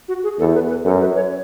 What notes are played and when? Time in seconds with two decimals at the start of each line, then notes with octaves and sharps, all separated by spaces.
0.08 F#4
0.23 G#4
0.39 E2 A4
0.54 B4
0.70 B4
0.85 F#2 A4
1.00 B4
1.16 C#5